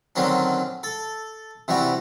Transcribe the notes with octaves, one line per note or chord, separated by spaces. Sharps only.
D3 D#3 F#3 C4 C#4
A4
C3 E3 G3 F#4